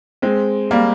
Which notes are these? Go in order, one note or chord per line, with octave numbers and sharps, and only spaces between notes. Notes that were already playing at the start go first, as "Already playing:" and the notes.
G#3 C4
G3 A#3